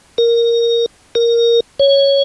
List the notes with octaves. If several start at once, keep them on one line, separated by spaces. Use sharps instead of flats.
A#4
A#4
C#5